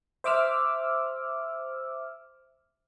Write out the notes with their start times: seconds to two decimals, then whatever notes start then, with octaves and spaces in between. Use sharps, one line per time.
0.24 C5 E5 D6 E6 F6